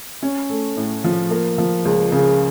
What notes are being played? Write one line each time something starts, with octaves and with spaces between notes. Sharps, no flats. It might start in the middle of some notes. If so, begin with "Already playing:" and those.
C#4
A3
A2
F3
A#3
F3
C#2
C#3